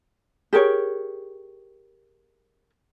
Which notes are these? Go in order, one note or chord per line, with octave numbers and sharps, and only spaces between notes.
G4 G#4 A#4 C#5